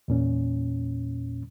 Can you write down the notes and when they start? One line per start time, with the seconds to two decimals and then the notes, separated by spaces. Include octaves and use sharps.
0.08 E2 A#2 C#4